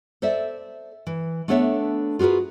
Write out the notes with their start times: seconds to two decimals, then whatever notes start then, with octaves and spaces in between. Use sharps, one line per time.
0.22 A4 C5 D5 E5
1.07 E3
1.48 A3 B3 D4 A4 C#5 E5
2.19 F4 F#4 G#4 A#4 B4